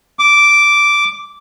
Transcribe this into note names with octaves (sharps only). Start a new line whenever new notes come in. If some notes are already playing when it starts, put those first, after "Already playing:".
D6